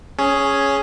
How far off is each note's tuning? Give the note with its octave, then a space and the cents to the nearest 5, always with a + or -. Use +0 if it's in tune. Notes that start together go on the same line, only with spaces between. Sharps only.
C#4 +0 G#4 +5